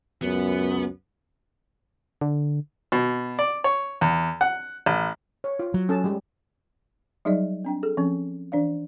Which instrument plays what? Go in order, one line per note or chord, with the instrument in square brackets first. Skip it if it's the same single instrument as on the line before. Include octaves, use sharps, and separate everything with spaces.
[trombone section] C#2 F#2 [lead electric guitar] B3
[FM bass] D3
[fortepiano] B2
D5
C#5
E2
F#5
A1
[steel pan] C#5
F4
[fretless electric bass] F#3
[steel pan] C#4 A4 A5
G3 G#3
[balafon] F#3 G3 D#4 G#4 D5 D#5
C4 D4 G5
G#4 A4
F3 C4 C#4
E3 D4 D5 F5